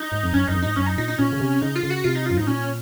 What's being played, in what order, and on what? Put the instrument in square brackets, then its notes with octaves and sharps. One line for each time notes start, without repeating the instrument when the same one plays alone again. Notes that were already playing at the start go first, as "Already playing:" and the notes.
Already playing: [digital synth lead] D#4
[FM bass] G#2
F2
[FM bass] F#2 [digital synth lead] C#4
[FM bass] F#2 [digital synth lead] D#4
[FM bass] F2
[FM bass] G#2 [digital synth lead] D#4
[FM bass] F#2 [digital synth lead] C#4
[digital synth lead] D#4
[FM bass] A#2 [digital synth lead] D#4
[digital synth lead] D#4
[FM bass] A#2 [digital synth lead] C#4
[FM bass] C#3
C3
[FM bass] C#3 [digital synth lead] D#4
[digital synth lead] F4
[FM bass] C#3
[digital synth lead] F#4
[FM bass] C3 [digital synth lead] F4
[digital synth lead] D#4
[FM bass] F#2 [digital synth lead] F4
[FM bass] G#2 [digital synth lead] D#4
[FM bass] A#2 [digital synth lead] C#4